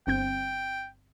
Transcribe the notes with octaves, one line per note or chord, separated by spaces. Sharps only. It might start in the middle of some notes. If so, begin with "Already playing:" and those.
G1 C4 G5 G6